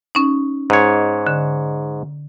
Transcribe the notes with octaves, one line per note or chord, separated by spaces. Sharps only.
C#4 D#4
G#2 C#5
D3